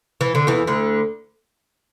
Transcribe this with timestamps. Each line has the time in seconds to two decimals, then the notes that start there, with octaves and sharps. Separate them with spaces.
0.21 E3
0.35 D3
0.47 E2 E3
0.67 D2 D3